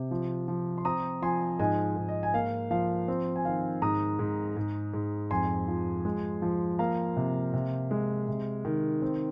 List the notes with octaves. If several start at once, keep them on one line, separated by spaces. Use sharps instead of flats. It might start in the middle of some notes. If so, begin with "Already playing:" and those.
Already playing: C3
F3
F3
C6
C4 A#5 D#6
F3 G#5 C6
G#2 D#5 G#5
G#2
D#5
G#5
A#3 F5
F3 F5
C4
G#5
D#3 F5
G#2 A#5 D#6
G#2
G#2
G#2
F2 G#5 C6
F3
G#3
F3
A#3 F5 A#5
C3
C3
G#3
C3
D#3
C4